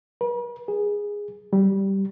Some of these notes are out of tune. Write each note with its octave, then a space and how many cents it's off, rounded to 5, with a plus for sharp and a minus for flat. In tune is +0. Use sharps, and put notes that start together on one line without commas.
B4 -45
G#4 -10
G3 -10